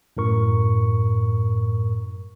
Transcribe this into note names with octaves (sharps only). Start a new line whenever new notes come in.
F#2 A2 A#4 C#6